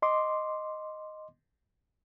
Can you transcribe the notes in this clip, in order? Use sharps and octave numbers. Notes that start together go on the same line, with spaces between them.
D#5 C6 D6